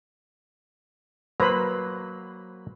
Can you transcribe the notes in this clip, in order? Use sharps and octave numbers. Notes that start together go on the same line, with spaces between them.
F#3 A#3 B4 C5 A#5 B5